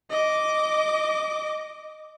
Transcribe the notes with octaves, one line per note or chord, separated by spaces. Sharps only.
D#5 D6